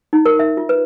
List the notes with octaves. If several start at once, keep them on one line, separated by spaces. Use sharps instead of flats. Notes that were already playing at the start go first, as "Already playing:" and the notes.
D#4
A#4
E5
F4
B4